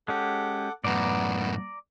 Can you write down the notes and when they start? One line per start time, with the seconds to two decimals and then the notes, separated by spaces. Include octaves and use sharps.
0.08 G#3 C#4 G4 A4 F#5 D6
0.84 F#2 A2 B3 D5 A#5